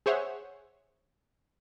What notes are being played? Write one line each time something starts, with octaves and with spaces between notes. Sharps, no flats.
G#4 C5 C#5 E5 F#5